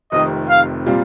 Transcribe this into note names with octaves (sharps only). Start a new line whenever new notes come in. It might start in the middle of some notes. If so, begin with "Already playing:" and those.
F1 F2 C3 D#3 D#5
F5
A#2 G3 C4 F4